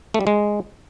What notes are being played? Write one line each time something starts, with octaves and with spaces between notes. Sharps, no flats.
A3
G3
G#3